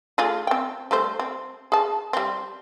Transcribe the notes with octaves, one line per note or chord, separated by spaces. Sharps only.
A3 F4 G#4
C4 G5
G3 A3 C5
C4
G#4 A5
G3 C4